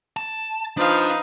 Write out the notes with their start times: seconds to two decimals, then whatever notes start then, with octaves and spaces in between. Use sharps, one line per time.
0.17 A5
0.78 F3 D4 D#4 B4 F5